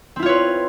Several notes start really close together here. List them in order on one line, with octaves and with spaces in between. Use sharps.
C4 E4 F4 C#5 B4